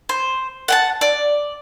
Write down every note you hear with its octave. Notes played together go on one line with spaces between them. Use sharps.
C5
F#5 G5 A5
D5